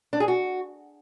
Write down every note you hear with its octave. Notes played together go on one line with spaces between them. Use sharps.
D4
G#4
F#4